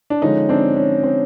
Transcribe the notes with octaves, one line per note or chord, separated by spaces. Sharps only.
D4
D3 F3 G#3 C#4 D#4
C4 D4
C#4
C4